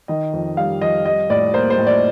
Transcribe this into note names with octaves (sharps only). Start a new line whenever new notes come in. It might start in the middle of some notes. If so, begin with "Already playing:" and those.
D#3 D#5
F2
G3 F5
F2 D#5
G3 D#5
A2 D5
A#3 C5
C5
A2
D5